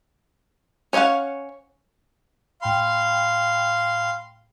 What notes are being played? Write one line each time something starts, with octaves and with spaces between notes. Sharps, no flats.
C#4 C#5 D#5 F5 F#5
A2 F5 G5 B5 C6